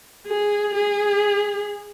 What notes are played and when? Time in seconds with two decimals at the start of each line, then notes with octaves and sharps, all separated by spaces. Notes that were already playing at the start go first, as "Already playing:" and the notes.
0.27 G#4
0.75 G#4